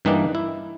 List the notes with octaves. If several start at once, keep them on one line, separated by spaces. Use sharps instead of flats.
G2 E3 G3 A#3 D4 D#4
E4